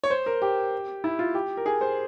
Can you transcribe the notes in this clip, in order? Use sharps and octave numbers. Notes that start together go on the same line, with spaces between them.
C#5
C5
A#4
G4
E4
F4
G4
A#4
G#4
C5